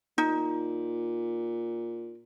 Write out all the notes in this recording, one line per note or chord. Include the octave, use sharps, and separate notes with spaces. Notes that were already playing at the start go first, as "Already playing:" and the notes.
A#2 D#4